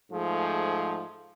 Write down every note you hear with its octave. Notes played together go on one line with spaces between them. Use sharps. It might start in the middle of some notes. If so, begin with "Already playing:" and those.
G#2 F3 A3 G#4